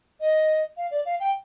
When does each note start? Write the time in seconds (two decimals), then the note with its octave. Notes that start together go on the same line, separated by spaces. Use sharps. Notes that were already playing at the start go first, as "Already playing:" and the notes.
0.20 D#5
0.77 F5
0.91 D5
1.05 F5
1.20 G5